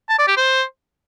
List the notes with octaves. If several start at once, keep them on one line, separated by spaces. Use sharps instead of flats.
A5
D5
G4
C5